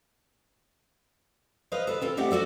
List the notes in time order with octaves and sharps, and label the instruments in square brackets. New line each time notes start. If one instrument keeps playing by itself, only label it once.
[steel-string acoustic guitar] B4 C5 D#5 F5
A4 B4
C4 F4 A4
A3 C4 G4 D#5 F#5
F#4 G4 A4 D5